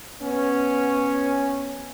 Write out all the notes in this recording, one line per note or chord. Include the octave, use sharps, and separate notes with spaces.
B3 C#4